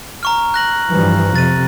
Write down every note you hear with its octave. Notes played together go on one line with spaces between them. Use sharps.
A#5 C#6 F6
F#6 A#6 F#7
G2 E3 F3
F2 C3 A6 D#7